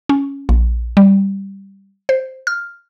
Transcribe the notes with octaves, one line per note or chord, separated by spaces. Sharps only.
C#4
A#1
G3
C5
F6